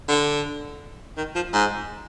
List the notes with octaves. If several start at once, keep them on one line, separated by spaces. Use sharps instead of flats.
D3
D#3
F3
G#2